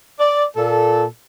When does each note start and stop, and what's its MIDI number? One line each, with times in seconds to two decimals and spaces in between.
0.20 0.44 74
0.56 1.05 46
0.56 1.05 69